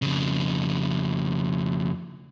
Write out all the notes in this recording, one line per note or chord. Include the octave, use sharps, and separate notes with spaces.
F2 C#3